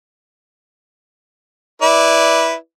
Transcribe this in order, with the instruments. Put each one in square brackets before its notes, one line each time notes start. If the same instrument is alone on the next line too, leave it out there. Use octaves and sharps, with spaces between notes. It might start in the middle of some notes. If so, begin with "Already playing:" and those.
[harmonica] E4 B4 D5